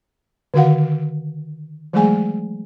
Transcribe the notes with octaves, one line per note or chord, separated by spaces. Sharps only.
D3 D#3 F#4 F5 F#5
E3 F#3 G#3 A3 G#4 G#5